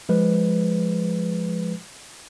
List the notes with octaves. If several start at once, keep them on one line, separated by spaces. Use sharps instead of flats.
F3 G#3 B4